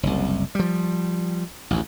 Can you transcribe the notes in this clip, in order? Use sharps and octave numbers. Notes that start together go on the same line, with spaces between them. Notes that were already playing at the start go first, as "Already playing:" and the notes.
F#1 C2
F3 G3
A1 D2